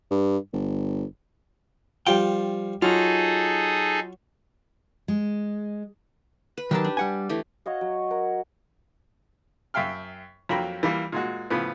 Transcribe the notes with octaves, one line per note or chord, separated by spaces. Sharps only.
G2
G1
F3 G3 F4 G5
F#3 D#4 F4 G#4 A4
G#3
B4
D#3 F#3 G4 A#4 A5
D4
G3 F#5 G#5
E3 A3 G4
F#4 C#5 D#5 F5
F#3
A#4 F#5
F#2 E5 F5 G5 F6
F2 F#3 A#3 G5 A#5 B5
E3 G3 A#3 F4
A#2 G#3 F#4
A2 C#3 F3 B3